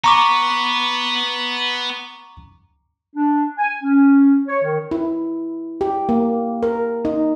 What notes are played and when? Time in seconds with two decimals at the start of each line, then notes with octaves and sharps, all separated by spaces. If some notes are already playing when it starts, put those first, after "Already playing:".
0.04 B3 A#5 C#6 D6
3.16 D4
3.58 G#5
3.83 C#4
4.47 C#5
4.62 D#3
4.91 E4
5.81 G4
6.09 A#3
6.63 A#4
7.05 D#4